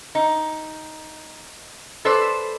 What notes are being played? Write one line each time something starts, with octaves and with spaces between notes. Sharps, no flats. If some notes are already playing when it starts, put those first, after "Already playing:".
D#4
A4 B4 C5 D5